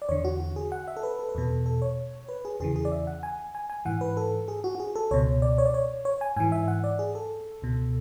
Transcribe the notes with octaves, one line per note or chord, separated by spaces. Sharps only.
D5
E2 D3 C#5
F#4
F#4
G#4
F#5
E5
A4
B4
A4
B4
E2 B2 A4
A4
C#5
B4
G#4
E2 C#3 E3 G#4
G#4
D5
E5
F#5
G#5
G#5
G#5
G#2 E3 F#5
B4
A4
G#4
F#4
F#4
G#4
A4
C#2 B2 C#5
D5
C#5
D5
C#5
C#5
G#5
G#2 E3 G#5
E5
F#5
D5
G#4
A4
C#2 B2